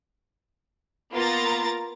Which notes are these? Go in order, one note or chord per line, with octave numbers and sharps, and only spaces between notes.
A#3 B3 F4 A#5 A6